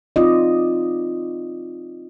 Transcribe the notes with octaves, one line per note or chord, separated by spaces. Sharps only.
C4 D#4 F4 D5 D#5